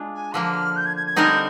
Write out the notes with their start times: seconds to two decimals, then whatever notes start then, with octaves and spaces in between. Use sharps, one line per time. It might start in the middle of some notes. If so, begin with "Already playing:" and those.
Already playing: G#3 D4 F4
0.15 G#5
0.34 D3 F3 A#3 F6
0.76 G6
0.86 G#6
0.96 G#6
1.07 G#6
1.16 D3 G3 C4 D#4 A#4 G6